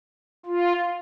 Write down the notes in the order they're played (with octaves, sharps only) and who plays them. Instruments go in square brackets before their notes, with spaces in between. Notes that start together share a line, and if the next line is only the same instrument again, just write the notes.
[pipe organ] F4